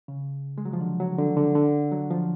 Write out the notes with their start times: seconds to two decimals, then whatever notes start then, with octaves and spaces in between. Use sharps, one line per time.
0.08 C#3
0.58 G#3
0.65 F#3
0.73 F3
0.81 D3
1.00 F#3
1.18 D3
1.37 D3
1.55 D3
1.92 F#3
2.11 F3